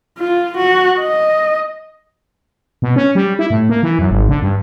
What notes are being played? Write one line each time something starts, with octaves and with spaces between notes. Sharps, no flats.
F4
F#4
D#5
B2
C#4
G3
E4
A2
A#3
E3
F#2
G#1
D3
G2